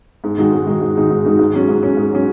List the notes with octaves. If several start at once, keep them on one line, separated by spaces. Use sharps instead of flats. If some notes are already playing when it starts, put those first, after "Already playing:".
G#2
D#3 G#3 D#4 F#4
G#2
D#3 G#3 D#4 F#4
G#2
D#3 G#3 D#4 F#4
G#2
D#3 G#3 D#4 F#4
G#2
F#3 C#4
G#2
F#3 C#4
G#2
F#3 C#4